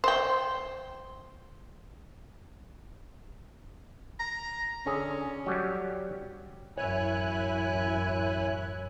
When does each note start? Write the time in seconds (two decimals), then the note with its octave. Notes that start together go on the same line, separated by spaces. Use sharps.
0.04 C5 G5
4.20 A#5
4.86 D3 C#4 G#4
5.46 F#3 G3 G4
6.78 A1 F#2 E4 C#5 G#5 F#6